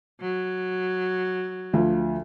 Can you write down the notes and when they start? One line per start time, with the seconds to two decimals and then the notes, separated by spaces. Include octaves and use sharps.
0.21 F#3
1.73 D2 F3